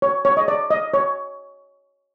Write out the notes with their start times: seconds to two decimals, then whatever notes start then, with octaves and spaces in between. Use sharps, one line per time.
0.02 C#5
0.25 C#5
0.37 D#5
0.48 D5
0.71 D#5
0.94 C#5